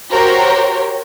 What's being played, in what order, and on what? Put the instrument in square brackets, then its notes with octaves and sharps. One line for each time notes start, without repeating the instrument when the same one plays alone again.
[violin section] F#4 G4 A#4 C5 C#5